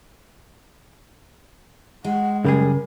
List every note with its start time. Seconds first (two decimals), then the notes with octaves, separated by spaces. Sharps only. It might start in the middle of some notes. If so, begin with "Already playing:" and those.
2.05 G#3 F#5
2.45 F#2 C#3 G3 G#4 A#4